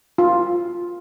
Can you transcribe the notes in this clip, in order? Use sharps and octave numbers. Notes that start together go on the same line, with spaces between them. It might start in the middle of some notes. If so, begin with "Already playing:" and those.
F4